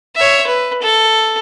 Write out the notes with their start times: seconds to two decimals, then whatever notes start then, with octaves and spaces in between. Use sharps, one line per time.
0.16 C#5 E5
0.47 B4
0.82 A4